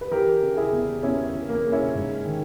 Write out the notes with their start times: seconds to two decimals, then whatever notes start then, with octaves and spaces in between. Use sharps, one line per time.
0.01 B4
0.11 E3 G4 A#4
0.43 C#3
0.57 E4 G#4
0.73 E2
1.03 E2 C#4 E4
1.34 E3
1.49 A#3
1.65 C#3
1.72 C#4 E4
1.95 G#2
2.25 D#3